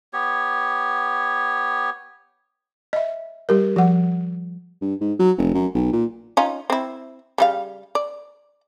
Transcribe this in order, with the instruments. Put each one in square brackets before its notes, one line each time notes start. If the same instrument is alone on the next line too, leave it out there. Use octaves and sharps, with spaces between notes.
[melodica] B3 G4 C#5
[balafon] D#5 E5
G3 G4 A#4
F3 F#5
[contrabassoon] G2
G#2
F#3
F1
F#2
B1
A#2
[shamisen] C#4 D#4 F4
C4 E4
C#3 G3 F5
D5